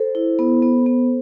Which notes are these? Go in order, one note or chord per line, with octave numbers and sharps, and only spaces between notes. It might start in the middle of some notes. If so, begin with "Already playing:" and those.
Already playing: A4 C5
E4
B3
B3
B3